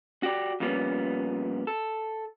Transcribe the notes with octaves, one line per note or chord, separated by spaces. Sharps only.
F#4 G4 D5
F2 A#2 G3 B3 C#4
A4